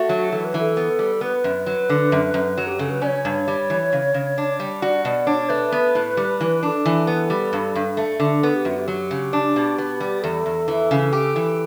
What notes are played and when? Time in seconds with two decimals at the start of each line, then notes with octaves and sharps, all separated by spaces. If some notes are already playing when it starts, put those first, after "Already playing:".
Already playing: A3 F#4
0.09 F#3
0.32 E3 A4
0.45 B4
0.54 E3 A4
0.77 B3
0.99 G3
1.21 B3 B4
1.44 F#2
1.66 F#3
1.89 D3
2.12 F#2
2.34 F#2
2.57 F#3
2.67 G4
2.79 C#3 A4
2.90 B4
3.02 C#4 D5
3.07 C#5
3.25 G2
3.48 G3
3.70 E3
3.93 C#3
4.14 C#3
4.38 D4
4.60 G3
4.82 F#4 D5
5.05 B2 D5
5.27 D4 C#5
5.49 A3 B4
5.72 B3
5.95 A2
6.17 G3
6.41 E3
6.62 D4 A4 B4
6.86 E3
7.07 B3
7.30 G3
7.53 G2
7.75 G2
7.97 A3
8.20 D3
8.42 B3 A4
8.55 G4
8.65 F#2 F#4
8.79 G4
8.88 F#3
9.11 C#3
9.33 D4
9.56 B2
9.78 B3
10.00 G3
10.22 E2 A4
10.46 E2
10.68 E3
10.91 C#3
11.13 G4
11.36 E3